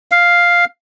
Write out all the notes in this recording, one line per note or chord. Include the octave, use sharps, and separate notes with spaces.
F5